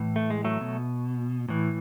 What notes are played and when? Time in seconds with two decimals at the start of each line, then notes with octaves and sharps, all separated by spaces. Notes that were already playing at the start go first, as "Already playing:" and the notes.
Already playing: A2 E3
0.16 A3
0.30 G#3
0.44 F#3 A3
0.61 B2
1.49 A2 E3